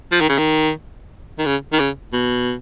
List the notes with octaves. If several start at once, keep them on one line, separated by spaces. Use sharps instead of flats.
F3
D#3
C#3
D#3
D#3
C#3
D#3
C#3
B2